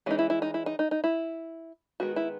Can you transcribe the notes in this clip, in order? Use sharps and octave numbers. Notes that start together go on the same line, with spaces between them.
E3 G#3 C#4 D#4
E4
E4
D#4
E4
D#4
D#4
D#4
E4
D#3 G#3 B3 F#4
E4